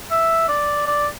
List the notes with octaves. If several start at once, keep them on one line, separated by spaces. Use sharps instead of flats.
E5
D5
D5